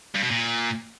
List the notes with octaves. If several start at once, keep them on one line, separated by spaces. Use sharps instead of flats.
G2
B2
A#2